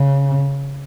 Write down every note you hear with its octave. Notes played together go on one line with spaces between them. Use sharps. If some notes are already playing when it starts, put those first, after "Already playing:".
Already playing: C#3